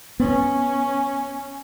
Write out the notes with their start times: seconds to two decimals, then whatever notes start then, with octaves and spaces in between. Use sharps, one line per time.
0.20 B3 C#4